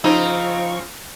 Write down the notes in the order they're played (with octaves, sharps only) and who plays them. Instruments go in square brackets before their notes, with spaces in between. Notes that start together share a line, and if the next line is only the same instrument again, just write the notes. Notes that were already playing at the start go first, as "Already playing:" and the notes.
[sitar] C#3 C4 [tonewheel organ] F3 C#6 [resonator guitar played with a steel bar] D#4 [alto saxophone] F4